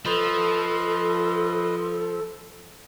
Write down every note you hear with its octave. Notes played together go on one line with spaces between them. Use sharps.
F3 A4 B4 C5 D#5